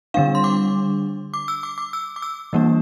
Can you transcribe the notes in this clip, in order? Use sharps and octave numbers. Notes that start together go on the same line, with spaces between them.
D3 G3 D4 F5
C6
D6
D6
E6
D6
D6
E6
D6
E6
E3 G3 A#3 D4